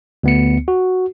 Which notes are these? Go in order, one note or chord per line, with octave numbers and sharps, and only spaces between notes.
D2 B3 C#7
F#4